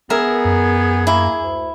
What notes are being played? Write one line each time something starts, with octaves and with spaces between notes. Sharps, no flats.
B3 G#4 A#4 E5
F#2
A#3 E4
D2